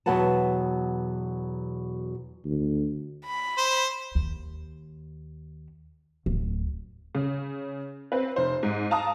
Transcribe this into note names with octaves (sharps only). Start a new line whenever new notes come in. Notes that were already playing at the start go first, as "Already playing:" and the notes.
E2 B2 F#3 B4 F#5 A5
D2
B5
C5
D#2
D1
C#3
C4 B4
F1 C5
G#2
F5 A5 A#5 D#6